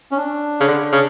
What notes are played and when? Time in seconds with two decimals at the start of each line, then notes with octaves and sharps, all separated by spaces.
0.11 C#4
0.18 D4
0.61 C#3
0.68 D3
0.92 C#3